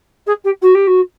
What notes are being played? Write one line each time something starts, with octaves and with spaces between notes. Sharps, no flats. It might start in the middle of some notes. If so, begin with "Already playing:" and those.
G#4
G4
F#4
G4
F#4